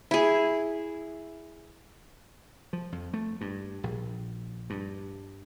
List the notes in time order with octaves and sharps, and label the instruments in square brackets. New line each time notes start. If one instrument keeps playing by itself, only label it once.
[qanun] E4 G#4
[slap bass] F3
F2
A3
G2
A#1
G2